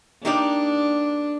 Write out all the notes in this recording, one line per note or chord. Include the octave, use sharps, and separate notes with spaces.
A#3 D4 D#4 G4 D5